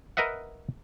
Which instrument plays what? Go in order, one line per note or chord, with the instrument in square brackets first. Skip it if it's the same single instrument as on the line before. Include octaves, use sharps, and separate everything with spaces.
[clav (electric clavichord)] A#4 B4 D#5 E5 F#5